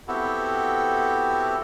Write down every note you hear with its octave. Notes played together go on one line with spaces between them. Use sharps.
B3 C4 E4 F#4 G4 A4